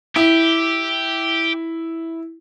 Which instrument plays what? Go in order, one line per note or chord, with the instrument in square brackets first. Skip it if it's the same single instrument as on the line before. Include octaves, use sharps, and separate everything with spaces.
[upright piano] E4 [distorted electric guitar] G4